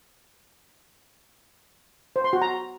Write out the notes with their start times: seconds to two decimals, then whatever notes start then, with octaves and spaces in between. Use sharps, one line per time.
2.16 C5
2.24 C6
2.33 F#4
2.42 A#5